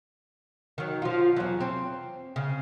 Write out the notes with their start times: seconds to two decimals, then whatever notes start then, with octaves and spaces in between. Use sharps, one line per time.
0.78 D#3 F#3
1.02 F3 F4
1.36 E2 F#3
1.61 C4
2.36 C#3